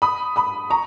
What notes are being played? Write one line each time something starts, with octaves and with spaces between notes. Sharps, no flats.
B5 D#6
B5 D#6
A#5 C#6